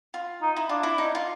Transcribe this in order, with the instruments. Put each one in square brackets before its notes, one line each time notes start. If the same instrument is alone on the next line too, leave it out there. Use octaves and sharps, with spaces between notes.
[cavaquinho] F4
[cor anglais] D#4
[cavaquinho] E4
[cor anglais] D4 [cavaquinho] F4
[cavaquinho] E4
D#4
F4